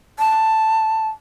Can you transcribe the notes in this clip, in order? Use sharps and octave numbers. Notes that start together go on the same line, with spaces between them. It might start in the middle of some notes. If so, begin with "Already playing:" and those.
A5